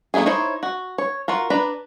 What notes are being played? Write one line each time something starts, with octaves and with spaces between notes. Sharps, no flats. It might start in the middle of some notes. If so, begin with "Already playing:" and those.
A3 A#3 D#4 E4 G#4
D#4 E4 C5 C#5
F#4
C#5
F4 F#4 A#4
D4 B4 D5 A#5 B5